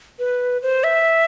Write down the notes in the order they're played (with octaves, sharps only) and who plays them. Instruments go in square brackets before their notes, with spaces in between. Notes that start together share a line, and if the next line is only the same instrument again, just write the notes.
[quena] B4
C5
E5